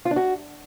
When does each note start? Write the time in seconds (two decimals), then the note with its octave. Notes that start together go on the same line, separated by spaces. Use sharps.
0.05 F4
0.11 D4
0.16 F#4